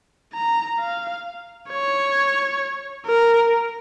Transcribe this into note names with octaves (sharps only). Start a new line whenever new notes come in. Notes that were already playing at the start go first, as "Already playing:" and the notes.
A#5
F5
C#5
A#4